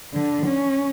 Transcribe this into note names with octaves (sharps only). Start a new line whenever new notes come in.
D3
C#4